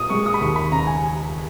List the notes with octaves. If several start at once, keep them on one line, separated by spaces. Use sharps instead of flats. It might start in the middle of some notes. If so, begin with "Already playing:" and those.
Already playing: A#2 D#6
G#3 C#6
D#6
B5
D#2 C#6
B5
C#3 A#5
G#5